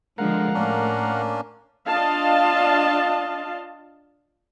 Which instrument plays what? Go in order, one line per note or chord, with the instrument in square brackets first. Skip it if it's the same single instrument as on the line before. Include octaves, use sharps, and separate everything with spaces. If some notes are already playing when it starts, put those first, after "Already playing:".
[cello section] D3 F3 G#3 [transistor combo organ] A#4 F5 F#5
[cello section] A2 [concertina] A#3 C#4 D4
[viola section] D4 F4 D#5 F5 A5